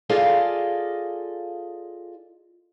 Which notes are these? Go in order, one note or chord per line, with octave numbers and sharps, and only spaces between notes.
F4 G#4 A4 D5 D#5 F5